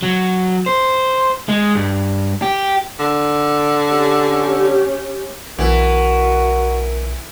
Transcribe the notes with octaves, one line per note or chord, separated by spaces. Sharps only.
F#3
C5
G#3
G2
G4
D3
C#4 G4
B1 E3 F#4 A#4